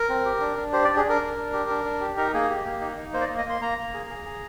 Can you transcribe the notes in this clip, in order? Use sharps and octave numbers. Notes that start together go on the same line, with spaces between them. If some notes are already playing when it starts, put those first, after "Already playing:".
Already playing: A#4
C4
G4
D4
D4
G4 C5
D4 D5
G#4
D4 A#4
D4
D4
G4
D4
D4
G4
D#4 A#4
A#3 G#4
G4
A#3
D#4
D#4
A#3 C5
D5
A#3 D#5
D#5
A#3 C6
A#3 A#5
A#3
G#4
G#4
G#4